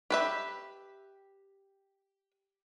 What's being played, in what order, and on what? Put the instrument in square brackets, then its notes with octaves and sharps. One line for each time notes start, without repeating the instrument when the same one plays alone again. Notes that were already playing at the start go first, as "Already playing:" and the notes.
[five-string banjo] G4 B4 E5